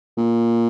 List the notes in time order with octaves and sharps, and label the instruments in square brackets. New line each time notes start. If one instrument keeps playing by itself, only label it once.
[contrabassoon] A#2